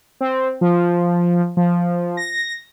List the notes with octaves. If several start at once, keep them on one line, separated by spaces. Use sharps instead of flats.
C4
F3
F3
A#6